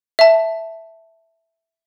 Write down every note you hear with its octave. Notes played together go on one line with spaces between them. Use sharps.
E5 A5